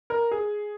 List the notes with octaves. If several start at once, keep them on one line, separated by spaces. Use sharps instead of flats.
A#4
G#4